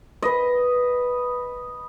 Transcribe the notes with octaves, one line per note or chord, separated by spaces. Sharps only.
B4 D#5